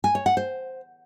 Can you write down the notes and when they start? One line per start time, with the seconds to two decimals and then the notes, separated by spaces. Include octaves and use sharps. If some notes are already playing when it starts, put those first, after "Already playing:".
0.04 G#5
0.15 C#5
0.26 F#5
0.37 C5